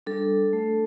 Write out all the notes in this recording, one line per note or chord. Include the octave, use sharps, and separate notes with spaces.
G3 D4 A4
A3 D4